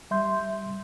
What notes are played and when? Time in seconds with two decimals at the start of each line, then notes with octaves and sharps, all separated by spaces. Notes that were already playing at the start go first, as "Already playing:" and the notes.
0.11 G3 E5 C6 G6